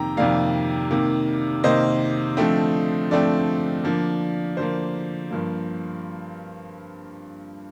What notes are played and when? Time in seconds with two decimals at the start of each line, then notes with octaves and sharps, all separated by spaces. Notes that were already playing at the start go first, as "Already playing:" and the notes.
Already playing: F2 C3 D#3 A#3 G5 A#5
0.17 F2 C3 D#3 A#3 D5 F5
0.91 C3 D#3 A#3
1.64 C3 D#3 A#3 C5 D#5
2.37 D3 F3 A3 C4
3.10 D3 F3 A3 C4 D5
3.84 D3 F3 A#3
4.57 D3 F3 A#3 C5
5.31 G2 F3 A#3